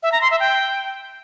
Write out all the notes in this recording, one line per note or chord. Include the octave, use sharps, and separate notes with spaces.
E5
A#5
C6
E5
G5